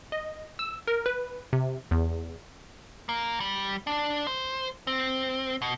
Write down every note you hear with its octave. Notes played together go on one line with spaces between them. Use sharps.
D#5
E6
A#4
B4
C3
E2
A#3
G3
D4
C5
C4
B2